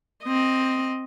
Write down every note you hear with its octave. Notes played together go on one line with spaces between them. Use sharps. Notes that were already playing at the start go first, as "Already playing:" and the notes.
C4 D#5